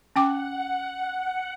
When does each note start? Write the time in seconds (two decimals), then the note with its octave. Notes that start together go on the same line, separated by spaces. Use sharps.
0.16 C#4 F#5 G5 D6